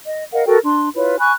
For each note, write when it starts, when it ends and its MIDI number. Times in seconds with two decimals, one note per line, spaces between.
0.06 0.24 75
0.33 0.44 70
0.33 0.44 75
0.33 0.44 77
0.33 0.44 78
0.46 0.57 66
0.46 0.57 69
0.46 0.57 70
0.46 0.57 79
0.64 0.88 62
0.64 0.88 84
0.94 1.16 64
0.94 1.16 65
0.94 1.16 71
0.94 1.16 73
1.19 1.32 80
1.19 1.32 83
1.19 1.32 85
1.19 1.32 90